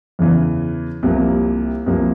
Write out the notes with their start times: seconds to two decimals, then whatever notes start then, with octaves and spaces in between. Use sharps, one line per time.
0.19 E2 C#3 E3
1.03 C2 C3 F3 A#3
1.86 C2 C3 F3 A#3